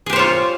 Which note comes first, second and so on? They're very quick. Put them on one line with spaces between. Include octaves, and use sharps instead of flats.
G#4 G4 C5 C#5 F4